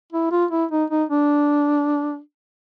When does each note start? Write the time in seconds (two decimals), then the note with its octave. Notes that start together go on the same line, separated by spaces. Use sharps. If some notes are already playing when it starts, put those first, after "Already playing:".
0.13 E4
0.32 F4
0.51 E4
0.71 D#4
0.90 D#4
1.09 D4